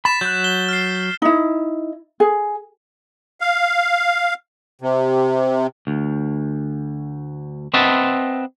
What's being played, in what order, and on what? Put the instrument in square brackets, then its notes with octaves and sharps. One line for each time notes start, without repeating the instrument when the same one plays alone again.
[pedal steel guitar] B5 [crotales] A6 B6 E7
[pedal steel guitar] F#3 F#6 [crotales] G6
[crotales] G7
F6 C7
[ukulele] D#4 E4
G#4
[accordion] F5
C3
[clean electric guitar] D2
C4 B4 D#5 E5 F#5 A5